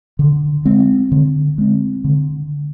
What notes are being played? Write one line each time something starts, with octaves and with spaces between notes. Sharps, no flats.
D3
G#3 C4
D3
G#3 C4
D3